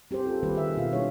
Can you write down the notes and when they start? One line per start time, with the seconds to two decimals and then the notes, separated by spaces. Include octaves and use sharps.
0.11 C4 G4 G#4 C5
0.25 F4 A4
0.43 D#3 G3 A#3 G4 B4
0.55 G#4 E5
0.77 B2 F4 F5
0.93 G3 D4 E4 G#4 C#5